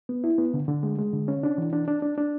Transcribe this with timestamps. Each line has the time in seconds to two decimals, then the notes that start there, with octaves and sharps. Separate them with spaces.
0.09 B3
0.24 E4
0.38 B3
0.54 D3
0.68 D3
0.83 G#3
0.98 G#3
1.13 D3
1.28 C#4
1.43 D4
1.58 E3
1.73 D4
1.88 D4
2.02 D4
2.18 D4